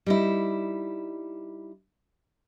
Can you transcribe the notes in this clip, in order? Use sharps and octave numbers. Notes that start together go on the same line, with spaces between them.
G3 D#4 E4